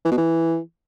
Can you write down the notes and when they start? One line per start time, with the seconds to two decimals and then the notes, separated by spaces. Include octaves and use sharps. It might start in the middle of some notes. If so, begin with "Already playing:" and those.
0.05 E3
0.12 B2
0.18 E3